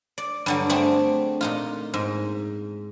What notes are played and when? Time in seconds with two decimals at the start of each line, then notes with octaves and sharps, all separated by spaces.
0.18 D5
0.46 G2 D3 F#3
0.69 A3 C4 D4 G#4 D5
1.41 A#2 D#4 F4
1.94 G#2